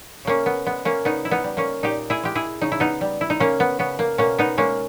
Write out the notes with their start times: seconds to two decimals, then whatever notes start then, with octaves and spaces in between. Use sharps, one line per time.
0.25 C#3 A#3 C#4
0.46 B3
0.66 G#3 B3
0.85 A#3 C#4
1.05 C#3 B3 D#4
1.25 E4
1.31 B3 D#4
1.44 G3
1.57 A#3 C#4
1.83 A#2 D#4 G4
2.10 E4 G#4
2.23 G#3 G4
2.35 E4 G#4
2.61 C#3 D#4
2.72 E4
2.80 B3 D#4
3.01 G3
3.21 E4
3.30 D#4
3.40 C#3 A#3 C#4
3.60 B3
3.79 C#3 B3
3.99 A#3
4.18 B2 A#3 C#4
4.39 B3 D#4
4.58 G#3 A#3 C#4